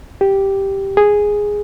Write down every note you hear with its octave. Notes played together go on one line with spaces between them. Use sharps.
G4
G#4